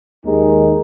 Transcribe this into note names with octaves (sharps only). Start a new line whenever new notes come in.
D#2 D#3 G#3 D#4